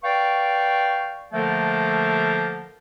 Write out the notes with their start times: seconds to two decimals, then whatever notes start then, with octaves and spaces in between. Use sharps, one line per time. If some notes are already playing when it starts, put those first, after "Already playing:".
0.04 B4 D5 F5 G5 C#6
1.33 D3 F3 A3 A#3 A4 A#4